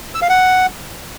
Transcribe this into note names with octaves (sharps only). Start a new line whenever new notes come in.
E6
F5
F#5